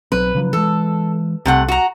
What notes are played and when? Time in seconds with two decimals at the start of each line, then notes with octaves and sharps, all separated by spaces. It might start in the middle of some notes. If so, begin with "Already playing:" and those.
0.12 B1 F#3 C4 B4
0.35 C#3 F3 F#3
0.53 E3 G#3 A4
1.46 C2 C3 A3 F#5
1.68 F#4 A#5